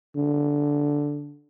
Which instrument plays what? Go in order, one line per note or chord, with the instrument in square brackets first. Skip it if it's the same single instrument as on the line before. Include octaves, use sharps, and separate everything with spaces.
[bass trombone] D3